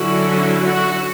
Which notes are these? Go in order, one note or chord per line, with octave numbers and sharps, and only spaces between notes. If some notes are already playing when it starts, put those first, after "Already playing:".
Already playing: D3 F#3 C#4 E4 F#4
F#4